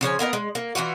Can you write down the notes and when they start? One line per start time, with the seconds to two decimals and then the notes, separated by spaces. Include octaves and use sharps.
0.01 C#3 F3 C#5 G#5
0.19 A#3 B3 A#4 D#5
0.33 G#3
0.55 A#3
0.75 E3 F3 F4 F#4